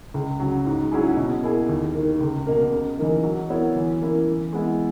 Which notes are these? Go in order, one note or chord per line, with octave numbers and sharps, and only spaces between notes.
C#2
C#3 F#3
G#2
F#3 C#4 E4 G#4
B2
A#3 E4 G#4
D#2
D#3 A#3
C#2
B2 A#3
C#3
E3 A#3 D#4
F#3
B3 E4 A#4 C#5
E3
A#3 C#4 E4 A#4
E3
G#3 B3 E4